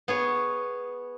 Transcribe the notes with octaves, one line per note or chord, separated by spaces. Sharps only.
B3 G#4 C#5